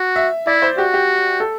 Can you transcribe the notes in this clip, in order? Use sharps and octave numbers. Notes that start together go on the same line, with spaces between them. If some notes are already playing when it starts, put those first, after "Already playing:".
Already playing: F#4
E5
E4 D5
C5
F#4 G4
G4
A4